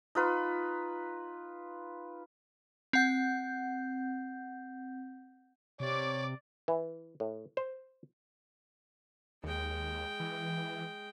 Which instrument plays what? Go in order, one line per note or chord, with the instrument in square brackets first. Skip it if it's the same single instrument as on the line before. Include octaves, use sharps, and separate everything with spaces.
[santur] D#4 F4 B4
[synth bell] C4 F#5 G6
[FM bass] C3 [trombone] C#5 [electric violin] D5 D6
[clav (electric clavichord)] E3
A2
C5
[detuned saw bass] D#2 [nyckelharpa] G#3 G5
[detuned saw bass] E3